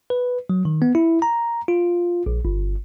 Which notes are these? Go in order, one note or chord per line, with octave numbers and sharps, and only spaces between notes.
B4
F#3
D#3
B3
E4
A#5
F4
A#1
G1